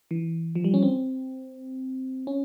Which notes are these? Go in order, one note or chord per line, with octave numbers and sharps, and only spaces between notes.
E3
F3
G3
C#4
C4
C#4